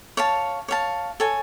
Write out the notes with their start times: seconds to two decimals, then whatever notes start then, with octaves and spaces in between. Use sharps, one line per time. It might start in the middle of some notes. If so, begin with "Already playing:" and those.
0.17 C#5 F5 A5
0.68 C#5 F5 A5
1.20 A4 C#5 G#5